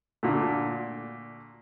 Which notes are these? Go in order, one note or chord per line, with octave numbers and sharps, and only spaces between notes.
A#2 D3 A3